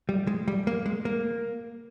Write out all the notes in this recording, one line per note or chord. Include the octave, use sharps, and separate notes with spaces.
G3
G#3
G3
A#3
G#3
A#3